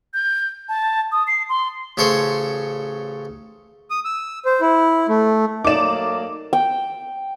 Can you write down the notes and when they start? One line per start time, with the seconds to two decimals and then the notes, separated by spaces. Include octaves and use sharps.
0.14 G6
0.69 A5
1.12 D#6
1.27 C7
1.49 C6
1.97 A1 C#3 A4 C5 C#5 C6
3.90 D#6
4.05 E6
4.45 C5
4.61 E4
5.09 A3
5.64 F#3 A3 A#3 D#4 D5 D6 E7
6.53 G5